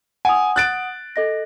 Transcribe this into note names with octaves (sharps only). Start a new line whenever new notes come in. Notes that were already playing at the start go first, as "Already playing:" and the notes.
F#5 G#5 D#6
F#6 A6 D7
A4 D#5 A#6